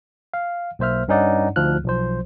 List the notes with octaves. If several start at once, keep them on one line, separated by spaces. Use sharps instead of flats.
F5
B1 A#3 C5 E5 F6
G2 C#4 D#4 D5 F#5
D2 F3 D#4 F4 F6 F#6
B1 F3 C5